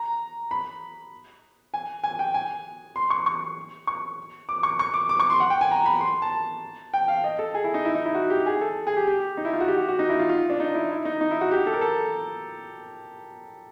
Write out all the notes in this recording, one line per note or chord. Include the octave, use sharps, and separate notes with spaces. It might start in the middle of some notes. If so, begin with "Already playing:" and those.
Already playing: A#5
B5
G#5
G#5
G5
G#5
C6
C#6
C#6
C#6
D6
C#6
C#6
D6
D6
C#6
C6
F#5
G5
G#5
A#5
B5
C6
A5
G5
F5
D#5
A4
G#4
E4
D#4
E4
D#4
E4
F#4
G4
G#4
A4
G#4
G4
G4
D#4
E4
F4
F#4
G4
F#4
F#4
D#4
E4
F4
F4
D4
D#4
E4
E4
D#4
D#4
E4
F#4
G4
A4
A#4
A4